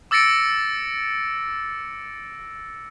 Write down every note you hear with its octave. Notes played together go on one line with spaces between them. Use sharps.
D6 E6 A6 A#6 C#7 D7